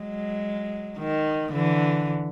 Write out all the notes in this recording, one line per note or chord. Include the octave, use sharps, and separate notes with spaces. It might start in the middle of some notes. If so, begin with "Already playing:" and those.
Already playing: F#3 G#3
D#3
D3 E3